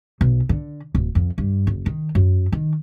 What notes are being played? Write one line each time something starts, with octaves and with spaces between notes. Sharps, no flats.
B1
D3
D1
F2
G2
F#1
D#3
F#2
D#3